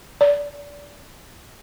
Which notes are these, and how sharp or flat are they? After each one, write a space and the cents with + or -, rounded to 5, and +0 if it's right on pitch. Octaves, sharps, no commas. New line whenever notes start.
D5 -25